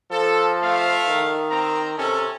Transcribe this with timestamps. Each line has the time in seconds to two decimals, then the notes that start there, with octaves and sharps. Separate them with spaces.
0.11 F3 A4
0.61 A3 F5
1.08 D#3
1.50 C4 A#5
1.98 C3 C#4 A4